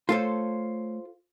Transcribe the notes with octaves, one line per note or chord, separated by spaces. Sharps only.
A3 F4 A4 C5 C#5